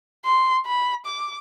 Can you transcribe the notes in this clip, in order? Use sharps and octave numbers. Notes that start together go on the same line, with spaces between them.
C6
B5
D6